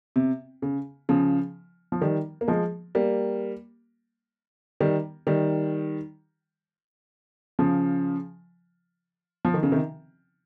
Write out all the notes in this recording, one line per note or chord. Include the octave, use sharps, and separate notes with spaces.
C3
C#3
C#3 F3
F3
D#3 G3
A#3
F3 G#3
G3 A#3
D#3 G3
D#3 G3
C#3 F3
F3
D#3
C#3
C3 D#3